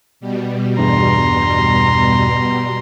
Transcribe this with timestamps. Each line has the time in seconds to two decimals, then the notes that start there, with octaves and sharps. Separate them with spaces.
0.20 B2 G3
0.79 E2 G2 A#5 C6